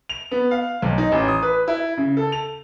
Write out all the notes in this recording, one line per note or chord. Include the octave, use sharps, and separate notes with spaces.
F7
B3
F5
B1
D#4
A1
D#6
B4
E4
C#3
A4
F7